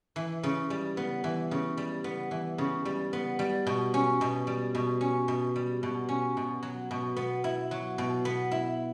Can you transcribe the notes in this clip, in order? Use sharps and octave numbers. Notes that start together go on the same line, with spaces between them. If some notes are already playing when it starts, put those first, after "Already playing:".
E3
C#3
G3
B3
E3
C#3
G3
B3
E3
C#3
G3
B3
G3
B2
C#4
B2
G3
B2
C#4
B2
G3
B2
C#4
B2
F#3
B2
B3
E4
F#3
B2
B3
E4